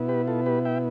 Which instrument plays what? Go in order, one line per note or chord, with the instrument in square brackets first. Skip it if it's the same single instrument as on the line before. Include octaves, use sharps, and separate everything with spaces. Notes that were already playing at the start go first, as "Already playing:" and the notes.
Already playing: [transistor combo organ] B2 B3 E4
G4 B4
F4 A4
G4 B4
E5 G5